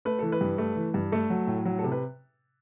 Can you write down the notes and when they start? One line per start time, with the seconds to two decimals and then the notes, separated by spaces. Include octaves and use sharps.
0.05 A3 B4
0.19 E3 A4
0.32 B4
0.41 G2
0.58 A3
0.76 E3
0.94 G2
1.12 A3 A4
1.30 F#3
1.47 A2
1.65 F#3
1.79 A4
1.83 C3
1.92 B4